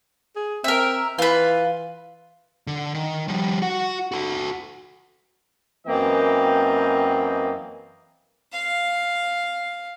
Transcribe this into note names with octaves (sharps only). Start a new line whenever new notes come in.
G#4
C4 A#4 E5
E3 F4 B4
D3
D#3
F3 G3
F#4 F#5
F#4 A4
F#2 E3 A#3 C4 D#5 G5
F5